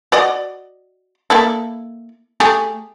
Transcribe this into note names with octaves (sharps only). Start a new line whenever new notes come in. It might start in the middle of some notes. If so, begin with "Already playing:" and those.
F#4 D5 D#5
A#3 E4 A4
A3 G4 G#4